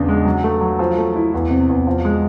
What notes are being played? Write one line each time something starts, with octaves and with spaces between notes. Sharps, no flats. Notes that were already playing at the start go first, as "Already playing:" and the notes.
Already playing: E2 C#3 D4
G#3
F#3
A3
F#3
F3
A3
E4
E2
C3
E2
F3
G#3